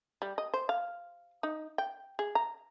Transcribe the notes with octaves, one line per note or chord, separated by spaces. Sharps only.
G3
D#5
C5
F5
D#4
G5
G#4
A#5